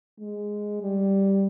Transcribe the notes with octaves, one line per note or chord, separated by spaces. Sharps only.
G#3
G3